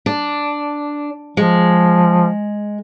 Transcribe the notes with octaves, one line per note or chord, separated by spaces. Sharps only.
D4
F3 G#3